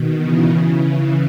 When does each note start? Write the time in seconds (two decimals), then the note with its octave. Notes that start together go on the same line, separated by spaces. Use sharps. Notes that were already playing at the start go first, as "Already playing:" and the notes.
Already playing: B2 D#3
0.18 C#3 E3
0.81 C#3